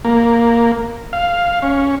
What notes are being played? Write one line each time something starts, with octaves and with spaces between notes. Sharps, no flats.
A#3
F5
C#4